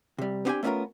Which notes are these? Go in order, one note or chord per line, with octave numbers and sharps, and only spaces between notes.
C3 G3
B3 C4 D4 G4 G5 G#5
A3 B3 C#4 D4 F4 A#4